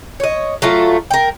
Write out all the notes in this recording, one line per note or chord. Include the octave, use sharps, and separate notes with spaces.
C#5 D#5
F#3 A3 F4
A#4 G5